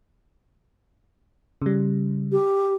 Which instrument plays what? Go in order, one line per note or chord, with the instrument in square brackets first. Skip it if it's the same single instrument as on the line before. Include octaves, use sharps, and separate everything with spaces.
[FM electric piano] C#3 G3
[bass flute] G4